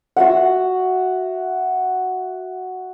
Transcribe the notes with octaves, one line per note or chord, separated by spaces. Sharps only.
F#4 E5 F#5